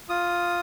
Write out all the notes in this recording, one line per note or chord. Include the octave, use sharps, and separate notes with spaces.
F4 D#6